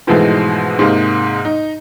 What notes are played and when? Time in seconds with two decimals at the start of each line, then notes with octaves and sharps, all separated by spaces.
0.07 G#2 B2 E3 F3 G#3 A3
0.79 G#2 C3 G#3 A#3
1.45 D#4